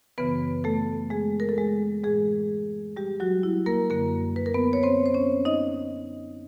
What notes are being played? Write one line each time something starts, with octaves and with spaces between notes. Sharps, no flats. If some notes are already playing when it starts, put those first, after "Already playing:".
F#2 C#3 E3 B3 B4
A3 A4
G#3 G#4
A#4
A4
G#3 G#4
A2 E3 G#3 G#4
G3 G4
F#3 F#4
E4
A#3 A#4
F#2 D3 A#3 A#4
B4
A#4
B3 B4
C#5
C4 C5
C5
C#4 C#5
D#4 D#5